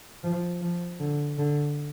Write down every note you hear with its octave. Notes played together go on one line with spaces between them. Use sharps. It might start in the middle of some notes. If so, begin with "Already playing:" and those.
F3
F3
D3
D3